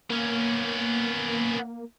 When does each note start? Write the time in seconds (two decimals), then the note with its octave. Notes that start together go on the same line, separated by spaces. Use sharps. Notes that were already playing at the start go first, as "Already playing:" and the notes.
0.10 A#3 B3 C#4